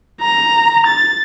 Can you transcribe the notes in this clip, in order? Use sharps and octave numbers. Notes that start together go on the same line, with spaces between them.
A#5
A6